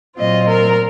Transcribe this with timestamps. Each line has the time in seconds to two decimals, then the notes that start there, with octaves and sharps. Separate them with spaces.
0.17 A#2 F#3 C4 F4 D#5
0.48 A#4